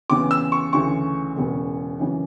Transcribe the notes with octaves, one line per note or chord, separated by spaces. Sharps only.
E2 C#3 E3 B3 D6
E6
C#6
D2 C#3 E3 C#6
E1 E2 C#3
F#2 C#3 E3